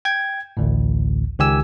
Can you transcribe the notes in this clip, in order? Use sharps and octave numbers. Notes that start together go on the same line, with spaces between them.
G5 G#6
A1 D2 A2
C#2 D#3 G4 G#5 E6